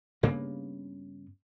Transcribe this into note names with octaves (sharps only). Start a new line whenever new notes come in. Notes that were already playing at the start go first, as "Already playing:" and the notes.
G2 C#3 A#3 B3